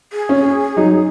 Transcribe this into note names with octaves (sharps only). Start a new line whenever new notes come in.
G#4
C#4
F#3 D#4